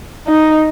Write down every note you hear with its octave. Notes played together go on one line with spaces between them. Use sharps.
D#4